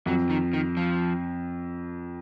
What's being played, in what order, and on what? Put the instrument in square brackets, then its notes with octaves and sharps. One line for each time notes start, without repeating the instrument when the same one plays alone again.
[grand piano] F2 [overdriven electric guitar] F#3
[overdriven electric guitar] D#3
D#3
F3